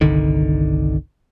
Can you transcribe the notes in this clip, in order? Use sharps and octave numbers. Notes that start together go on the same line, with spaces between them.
G1 C2 D3 D#3